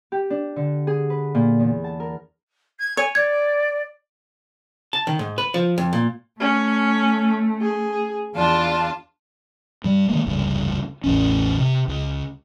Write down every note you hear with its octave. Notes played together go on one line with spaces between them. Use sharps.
G4
D4
D3
G#4
B4
A#2
E2
A5
A#4
G#6
C#5 G#5
D5 G#6
A5
D#3
G#2
B4
F3
F2
A#2
A3 C#4
G#4
E2 D4 F4 A5
G2 G3
D#3 G#3 A#3
F1 C#2 G2
A1 E2 C#4
C3
C#2